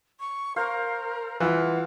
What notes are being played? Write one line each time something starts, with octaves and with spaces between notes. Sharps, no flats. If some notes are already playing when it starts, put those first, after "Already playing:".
C#6
A#4 C5 F5
E3 F4 F#5